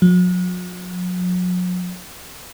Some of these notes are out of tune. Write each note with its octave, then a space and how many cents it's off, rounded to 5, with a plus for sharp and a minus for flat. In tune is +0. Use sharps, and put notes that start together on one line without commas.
F#3 -40